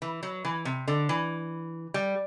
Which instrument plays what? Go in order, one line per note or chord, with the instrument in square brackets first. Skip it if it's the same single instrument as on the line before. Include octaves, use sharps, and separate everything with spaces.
[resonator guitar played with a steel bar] E3
F#3
E3
C3
D3
E3
G3